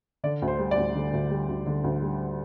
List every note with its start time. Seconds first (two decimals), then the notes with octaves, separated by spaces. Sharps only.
0.24 D3 D5
0.42 D2
0.48 C5
0.59 G3
0.71 D5
0.77 D2
0.95 D3
1.13 D2
1.31 G3
1.49 D2
1.66 D3
1.84 D2
2.02 G3